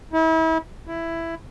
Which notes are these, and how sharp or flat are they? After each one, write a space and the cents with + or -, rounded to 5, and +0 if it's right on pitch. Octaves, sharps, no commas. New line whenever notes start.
E4 -35
E4 +10